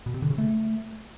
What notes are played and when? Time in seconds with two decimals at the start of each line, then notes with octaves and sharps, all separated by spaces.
0.06 B2
0.14 C3
0.22 D3
0.30 C#3
0.38 A3